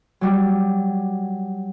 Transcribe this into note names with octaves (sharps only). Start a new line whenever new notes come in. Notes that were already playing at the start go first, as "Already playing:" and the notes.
F#3 G3 F#4